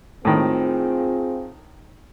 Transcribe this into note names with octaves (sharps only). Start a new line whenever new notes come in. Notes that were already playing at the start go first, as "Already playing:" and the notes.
A2 D#3 C4 F4 G#4